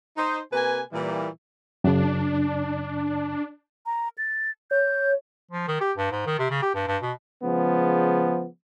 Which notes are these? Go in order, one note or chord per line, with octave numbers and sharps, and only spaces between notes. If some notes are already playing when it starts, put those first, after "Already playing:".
D#4 C5
C3 A#3 B4 G#5
A#2 E3 G3
F#2 C#3 D4
A#5
A6
C#5 G6
F3
D#3
G4
G2
G#2
D#3
C3
C#3
G4
G2
G2
B2
C#3 F3 G#3 B3